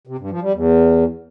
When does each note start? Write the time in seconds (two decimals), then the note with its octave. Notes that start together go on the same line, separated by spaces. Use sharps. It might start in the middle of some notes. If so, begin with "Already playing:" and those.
0.07 C3
0.19 G2
0.30 F3
0.42 G3
0.54 E2